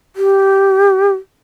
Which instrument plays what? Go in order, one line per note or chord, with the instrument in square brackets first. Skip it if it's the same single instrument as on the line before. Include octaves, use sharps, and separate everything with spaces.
[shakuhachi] G4